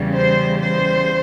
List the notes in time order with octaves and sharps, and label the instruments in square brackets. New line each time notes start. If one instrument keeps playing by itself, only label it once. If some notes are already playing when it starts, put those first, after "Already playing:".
Already playing: [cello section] E2 C#3 G3
C5
C5